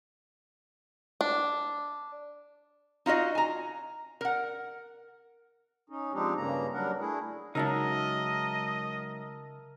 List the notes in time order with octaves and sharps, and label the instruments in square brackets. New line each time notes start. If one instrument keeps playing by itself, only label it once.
[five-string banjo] D4
[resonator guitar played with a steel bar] D#4 F4 F#4 D#5
G#5 A#5
A#4 F#5
[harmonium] C#4 D#4
F3 G#3 C4 D4 D#4 G4
G2 C#3 A#3 A#5
F#3 G3 D4 A#4 F#5
A3 D4 E4 G#4
[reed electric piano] C#3 [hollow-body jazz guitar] F#3 G#3 D#4 [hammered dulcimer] A#4 E5 A5 [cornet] D#5